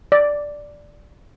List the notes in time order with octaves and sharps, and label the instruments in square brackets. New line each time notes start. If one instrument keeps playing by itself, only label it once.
[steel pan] D5